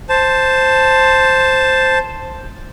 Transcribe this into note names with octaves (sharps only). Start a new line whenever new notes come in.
C5 A5